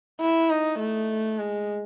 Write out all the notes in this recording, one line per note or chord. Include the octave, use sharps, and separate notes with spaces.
E4
D#4
A3
G#3